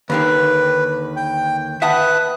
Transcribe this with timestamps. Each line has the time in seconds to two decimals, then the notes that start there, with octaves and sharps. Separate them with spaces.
0.10 D#2 D3 D#3 B4
1.16 G5
1.82 B4 E5 F#5 A5 D#6 F#6